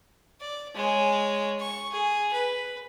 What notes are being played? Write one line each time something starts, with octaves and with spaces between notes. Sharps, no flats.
D5
G#3 C#5
C#6
G#4
B4